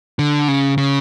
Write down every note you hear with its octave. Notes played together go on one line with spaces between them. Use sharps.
D3
C#3
C#3